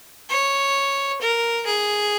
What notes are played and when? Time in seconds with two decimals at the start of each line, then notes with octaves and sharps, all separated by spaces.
0.29 C#5
1.21 A#4
1.66 G#4